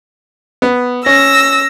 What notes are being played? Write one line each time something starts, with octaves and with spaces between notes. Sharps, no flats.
B3
C#4 E6 A#6